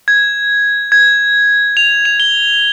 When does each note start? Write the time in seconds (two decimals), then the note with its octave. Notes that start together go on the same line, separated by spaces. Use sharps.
0.08 G#6
0.92 G#6
1.77 F7
2.05 F7
2.20 G7